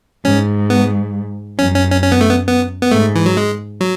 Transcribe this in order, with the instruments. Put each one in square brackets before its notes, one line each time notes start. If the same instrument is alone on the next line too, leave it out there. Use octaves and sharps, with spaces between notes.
[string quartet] G#2 [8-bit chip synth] C#4
[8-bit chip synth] B3
[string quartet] F#2 [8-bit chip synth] C#4
[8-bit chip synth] C#4
C#4
C#4
B3
A3
B3
B3
B3
[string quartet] G#2 [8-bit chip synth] A3
[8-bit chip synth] E3
F#3
G#3
F#3